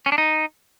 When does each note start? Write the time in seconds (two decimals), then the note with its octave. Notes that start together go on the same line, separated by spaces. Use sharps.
0.06 C#4
0.12 D4
0.18 D#4